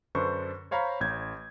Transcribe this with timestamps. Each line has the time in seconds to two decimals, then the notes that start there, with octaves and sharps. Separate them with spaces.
0.15 F#2 D3 D4 B4 C5 C#6
0.71 C5 C#5 F5 A#5 B5
1.00 A1 G6 G#6